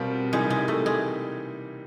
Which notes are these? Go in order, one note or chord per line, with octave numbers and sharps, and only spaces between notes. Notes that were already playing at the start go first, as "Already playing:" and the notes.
Already playing: B2 G3 C4 F4 A#4
C3 E3 G3 G#3 A#3 D#4
G#3
A3
G#3